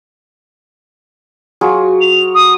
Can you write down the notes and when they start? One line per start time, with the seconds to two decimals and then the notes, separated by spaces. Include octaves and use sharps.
1.61 F#3 F4 G#4
2.01 F7
2.35 D#6